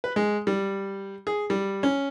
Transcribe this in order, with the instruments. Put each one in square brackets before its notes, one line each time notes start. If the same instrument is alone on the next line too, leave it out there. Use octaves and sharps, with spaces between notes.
[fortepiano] B4
G#3
G3
G#4
G3
C#4